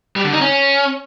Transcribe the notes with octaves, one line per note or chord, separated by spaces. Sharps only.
G3
D3
D#4
C#4